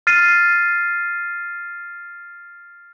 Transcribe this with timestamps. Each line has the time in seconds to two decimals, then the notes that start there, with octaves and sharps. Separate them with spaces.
0.07 F6 A6 C7 D#7